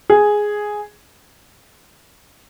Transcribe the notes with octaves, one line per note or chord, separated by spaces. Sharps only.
G#4